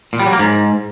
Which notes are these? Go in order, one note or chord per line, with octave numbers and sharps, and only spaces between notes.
A#2
G3
F#3
A#3
G#2